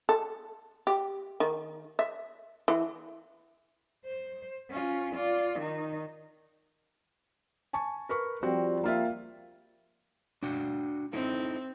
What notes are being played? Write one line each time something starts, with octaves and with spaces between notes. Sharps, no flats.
A4
G4
D#3
E5
E3
C5
C#4 F4
F4 D5
D#3 D#4
G#5 A5 C#6
A#4 B4 C#6
F3 G3 C4 F#4
A#3 F4 E5
D4 F#4 G5
C4 D#4 E4 A4